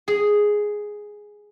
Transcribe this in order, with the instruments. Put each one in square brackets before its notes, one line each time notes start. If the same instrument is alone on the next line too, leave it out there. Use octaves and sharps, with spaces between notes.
[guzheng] G#4